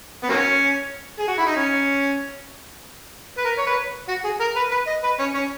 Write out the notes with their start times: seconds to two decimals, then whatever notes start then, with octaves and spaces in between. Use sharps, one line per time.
0.23 B3
0.29 F#3 A#3 C#4
1.19 G#4
1.28 F#4
1.38 E4
1.46 D#4
1.56 C#4
3.38 B4
3.45 A#4
3.58 C#5
3.67 B4
4.09 F#4
4.25 G#4
4.40 A#4
4.56 B4
4.72 B4
4.87 D#5
5.04 B4
5.19 C#4
5.35 C#4